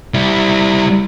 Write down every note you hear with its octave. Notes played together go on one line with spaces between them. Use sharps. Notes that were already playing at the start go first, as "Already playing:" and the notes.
G3 E4